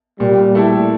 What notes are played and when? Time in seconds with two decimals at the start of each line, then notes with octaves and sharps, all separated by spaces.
0.20 A#2 G3
0.55 A3 E4 A4